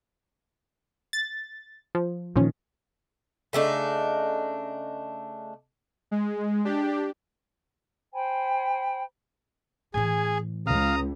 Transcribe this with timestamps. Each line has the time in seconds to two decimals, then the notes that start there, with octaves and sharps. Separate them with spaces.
1.13 A6
1.95 F3
2.36 A#2 D3 D#3 F3 C#4
3.53 C#3 A3 D4 D#4
6.11 G#3
6.65 D4 G4
8.14 C5 G5 G#5 B5
9.94 A2 E3 G#4 G#5
10.67 C#2 F5 A#5 D#6